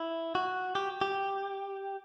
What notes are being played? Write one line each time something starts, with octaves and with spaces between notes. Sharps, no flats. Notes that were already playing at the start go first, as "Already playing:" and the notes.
Already playing: E4
F#4
G4
G4